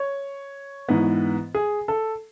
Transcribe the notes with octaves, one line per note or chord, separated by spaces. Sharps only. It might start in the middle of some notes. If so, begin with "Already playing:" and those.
Already playing: C#5
G#2 E3 B3
G#4
A4